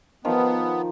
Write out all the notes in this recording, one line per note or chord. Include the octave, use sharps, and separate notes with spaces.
D#3 F3 B3 F5